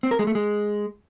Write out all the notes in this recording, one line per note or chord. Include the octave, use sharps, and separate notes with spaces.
C4
A#4
G#3
A3
G#3